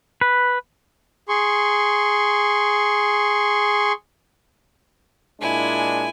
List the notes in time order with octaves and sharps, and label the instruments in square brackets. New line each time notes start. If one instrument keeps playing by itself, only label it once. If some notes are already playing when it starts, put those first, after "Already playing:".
[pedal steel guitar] B4
[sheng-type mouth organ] G#4 C6 C#6
[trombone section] A#2 G#3 D4 [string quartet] E4 G#5